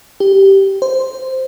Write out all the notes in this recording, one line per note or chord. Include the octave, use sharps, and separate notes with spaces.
G4
C5